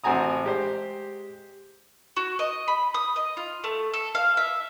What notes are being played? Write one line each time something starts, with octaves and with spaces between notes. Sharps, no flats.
A1 C4 F#4 G#5 A#5 D#6
G#3 G4 C5
F#4
D#5
B5
D#6
D#5
F4
A3
A4
F5
E5